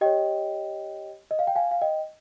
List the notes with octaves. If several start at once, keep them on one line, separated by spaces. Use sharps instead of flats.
G4 C#5 D#5 G5
D#5
F5
G5
F5 G#5
F5
D#5 G5